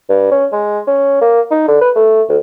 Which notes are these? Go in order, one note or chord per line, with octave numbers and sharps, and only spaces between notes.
G2
C#4
G#3
C#4
A#3
D#4
D3
B4
A3
D2